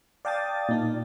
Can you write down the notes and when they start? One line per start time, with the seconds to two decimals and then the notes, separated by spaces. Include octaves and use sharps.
0.25 D5 F5 G5 A5 D#6 A6
0.69 A#2 D#4 D5